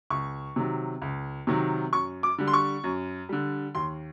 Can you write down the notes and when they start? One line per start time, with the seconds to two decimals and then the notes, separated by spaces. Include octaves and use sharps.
0.10 C#2 C#6
0.56 C3 D#3 F#3
1.02 C#2
1.47 C3 D#3 F#3
1.93 F#2 C#6
2.23 D6
2.38 D3 G3
2.48 C6
2.53 C#6
2.84 F#2
3.29 D3 G3
3.75 D#2 C6